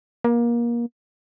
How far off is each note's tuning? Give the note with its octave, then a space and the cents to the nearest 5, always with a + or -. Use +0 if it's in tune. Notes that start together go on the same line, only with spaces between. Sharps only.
A#3 +25